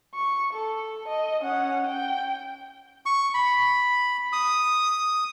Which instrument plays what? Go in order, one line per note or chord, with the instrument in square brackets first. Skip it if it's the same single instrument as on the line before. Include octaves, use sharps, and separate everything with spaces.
[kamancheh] C#6
A4
D#5
C#4 F#5
G5
[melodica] C#6
B5
D#6